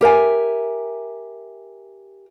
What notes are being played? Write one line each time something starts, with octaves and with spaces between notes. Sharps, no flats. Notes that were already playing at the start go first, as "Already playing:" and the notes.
G4 A#4 E5 G#5